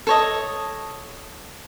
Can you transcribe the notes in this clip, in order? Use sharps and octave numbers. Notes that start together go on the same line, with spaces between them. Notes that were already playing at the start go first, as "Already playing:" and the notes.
A4 C#5 D#5